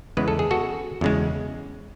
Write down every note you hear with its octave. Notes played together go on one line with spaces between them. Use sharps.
E2 C#3 G#3 B4
A4
G#4
F#4 A4
E2 C#3 G#3